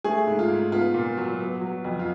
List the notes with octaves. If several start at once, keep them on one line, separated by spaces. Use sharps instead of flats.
A3 G#4
G#2
F4
G#2
B3 F4
A#2
F#3
B3
F#3
F2
F4